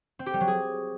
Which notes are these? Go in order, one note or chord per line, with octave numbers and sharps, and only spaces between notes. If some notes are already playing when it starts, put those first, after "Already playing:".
C4
G4
G3
F#3
G#4